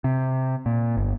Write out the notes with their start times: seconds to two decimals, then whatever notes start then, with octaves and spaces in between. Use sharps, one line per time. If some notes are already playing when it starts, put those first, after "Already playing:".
0.04 C3
0.66 A#2
0.97 G1